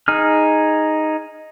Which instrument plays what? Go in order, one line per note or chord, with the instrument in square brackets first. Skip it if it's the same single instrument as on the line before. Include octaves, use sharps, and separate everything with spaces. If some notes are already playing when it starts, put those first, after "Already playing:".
[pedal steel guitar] D#4 G#4 F6